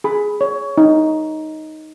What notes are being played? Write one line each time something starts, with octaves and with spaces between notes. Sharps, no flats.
G#4 B5
C#5
D#4